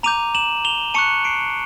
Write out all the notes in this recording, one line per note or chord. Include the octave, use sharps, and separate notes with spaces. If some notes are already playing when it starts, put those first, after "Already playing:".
A#5 D6 G6 D#7 F7
E7 F#7
F7 G7
A5 C#6 F#6 C#7 D#7
C7 D7